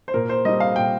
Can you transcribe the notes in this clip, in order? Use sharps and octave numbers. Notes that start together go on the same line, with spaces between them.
C5
A#2 A#4
C5
G3 C4 D#4 D#5
F5
A#2 G5